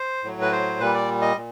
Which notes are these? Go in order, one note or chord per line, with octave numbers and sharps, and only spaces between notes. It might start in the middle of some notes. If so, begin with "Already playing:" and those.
Already playing: C5
A2 F#3
B4
C5
A#2 G3 B4
D5
D#5
A#2